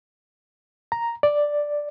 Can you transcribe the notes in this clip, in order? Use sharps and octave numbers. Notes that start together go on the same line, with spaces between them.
A#5
D5